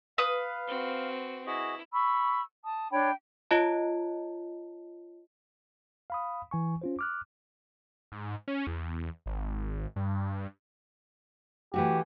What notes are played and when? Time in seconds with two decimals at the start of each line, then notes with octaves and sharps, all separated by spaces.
0.18 B4 F5 D#6
0.67 C4 F#4
1.46 E4 F#4 G#4 D#5
1.92 B5 C#6 E6
2.64 A5 D#6
2.91 D4 C#5 G5 B5
3.51 F4 C#5 D#5 A5
6.10 F5 B5 D#6
6.51 E3 G#5 C#6
6.82 C#4 F4 C5
6.99 D6 F6 F#6
8.12 G#2
8.48 C#4
8.67 E2
9.26 G#1
9.96 G2
11.74 E3 A3 F#4 G4